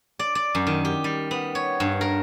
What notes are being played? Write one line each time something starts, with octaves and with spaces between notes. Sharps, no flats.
D5
D5
F#2
D#3
G4
G3
B3
C#5
G2
A#4